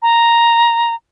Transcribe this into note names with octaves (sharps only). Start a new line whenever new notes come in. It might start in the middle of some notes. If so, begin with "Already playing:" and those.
A#5